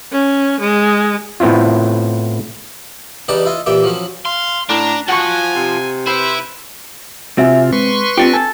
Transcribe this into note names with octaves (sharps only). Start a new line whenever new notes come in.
C#4
G#3
A2 B3 C4 E4 F4
E2 G3 D#4 G4 B4 A5
E4 F4 D#5
A#2 E3 G4 E5 G5
F3 F#3 C#4
F5 C6
A2 D4 A#5
F3 F#4 F#5 G#5 C#6
C3
E4 B4 C5
C3 C4 F4 F#4 E5 G#5
G#3 B4 C6 C#6
C4 D4 F4 G4 C#7
A4 G#5